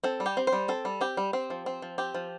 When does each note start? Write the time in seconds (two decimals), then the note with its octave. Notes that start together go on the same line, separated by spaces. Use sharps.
0.04 C4 A4
0.20 G3
0.26 G4
0.37 C4
0.47 C5
0.52 G3
0.68 C4 A4
0.85 G3
1.01 C4 G4
1.17 G3
1.33 C4
1.50 F3
1.66 C4
1.82 F3
1.98 C4 G4
2.14 F3